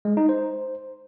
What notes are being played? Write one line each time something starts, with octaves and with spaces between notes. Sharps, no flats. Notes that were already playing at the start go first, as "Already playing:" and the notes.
G#3
D#4
C5